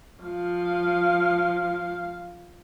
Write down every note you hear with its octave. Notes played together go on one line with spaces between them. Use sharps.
F3 F5